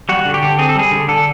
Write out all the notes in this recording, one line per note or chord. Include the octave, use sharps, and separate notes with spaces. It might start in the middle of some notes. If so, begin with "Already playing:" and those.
G3 F#4
D3
G4
D3
C4 G#4
A4
G3 G#4
D3
D3 A4